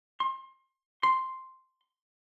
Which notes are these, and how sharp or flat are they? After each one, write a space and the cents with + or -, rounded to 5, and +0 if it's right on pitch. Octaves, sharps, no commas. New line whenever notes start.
C6 +30
C6 +0